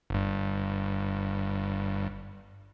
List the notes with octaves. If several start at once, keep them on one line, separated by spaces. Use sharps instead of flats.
G1 G2